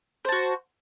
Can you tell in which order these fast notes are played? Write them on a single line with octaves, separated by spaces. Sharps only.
C5 A5 F#4